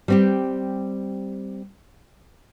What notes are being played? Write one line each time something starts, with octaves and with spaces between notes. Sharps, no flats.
G3 C4 G4